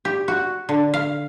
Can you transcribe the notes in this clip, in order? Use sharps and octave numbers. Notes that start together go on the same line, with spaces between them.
G4
F#4
D3
F5